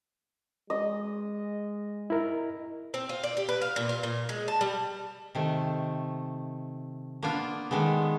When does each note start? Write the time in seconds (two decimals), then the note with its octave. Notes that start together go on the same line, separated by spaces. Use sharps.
0.70 G#3 D#5
2.10 E4 A#4
2.94 C4
3.09 F4
3.23 D5
3.37 G4
3.49 B4
3.61 F5
3.76 A#2
3.89 F4
4.03 A#2
4.29 G#3
4.48 A5
4.61 G3
5.35 C3 D#3 A3
7.23 A#3 B3 D4 F4
7.71 D#3 G#3 A3 B3